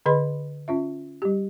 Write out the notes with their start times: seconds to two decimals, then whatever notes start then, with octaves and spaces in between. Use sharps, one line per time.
0.06 D3 G#4 B4 D#5 B5 C6
0.68 C#4 F4 E5
1.22 G3 G4